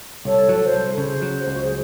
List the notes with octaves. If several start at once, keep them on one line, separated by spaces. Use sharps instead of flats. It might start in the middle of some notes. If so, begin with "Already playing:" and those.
C2 A4 C#5
F#3 C#5
C5
C2
A4
C#3 C5
F#3
C#2 F#4
G#4